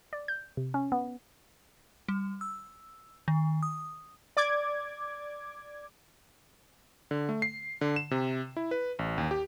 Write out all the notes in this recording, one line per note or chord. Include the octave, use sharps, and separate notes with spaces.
D5
G6
C3
C#4
B3
G3
E6
D#3
D#6
D5 D6 G#6
D3
A3
C7
D3
E7
C3
E4
B4
A1
D#2
G4